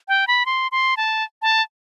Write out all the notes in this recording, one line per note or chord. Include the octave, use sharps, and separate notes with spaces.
G5
B5
C6
C6
A5
A5